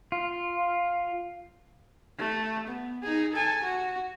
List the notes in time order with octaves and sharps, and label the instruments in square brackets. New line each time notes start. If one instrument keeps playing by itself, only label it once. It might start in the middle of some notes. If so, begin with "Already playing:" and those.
[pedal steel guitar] F4
[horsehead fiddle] A3
B3
D#4 G#4
A4 G#5
F#4